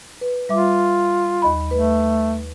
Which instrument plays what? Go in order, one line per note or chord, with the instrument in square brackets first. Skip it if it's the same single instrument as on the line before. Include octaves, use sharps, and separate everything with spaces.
[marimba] B4
[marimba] G3 E5 D6 [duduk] F4
[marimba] D#2 D#5 B5
[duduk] A3 [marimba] B4